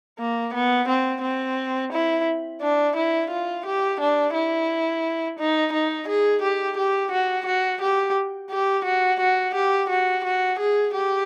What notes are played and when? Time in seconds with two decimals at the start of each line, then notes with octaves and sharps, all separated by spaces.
0.18 A#3
0.54 B3
0.88 C4
1.22 C4
1.92 E4
2.61 D4
2.96 E4
3.30 F4
3.66 G4
4.00 D4
4.34 E4
5.39 D#4
5.73 D#4
6.08 G#4
6.42 G4
6.77 G4
7.11 F#4
7.46 F#4
7.81 G4
8.50 G4
8.84 F#4
9.20 F#4
9.55 G4
9.89 F#4
10.24 F#4
10.59 G#4
10.93 G4